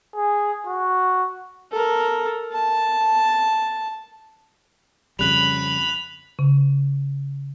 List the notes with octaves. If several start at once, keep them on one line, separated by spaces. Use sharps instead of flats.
G#4
F#4
A4 A#4
A5
F2 C#3 G3 B5 F#6 F7
C#3